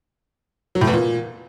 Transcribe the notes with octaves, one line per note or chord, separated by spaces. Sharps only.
F#3
A2
E2
A#2